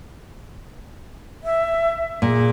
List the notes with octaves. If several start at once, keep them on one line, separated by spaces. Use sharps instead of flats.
E5
A#2 G#4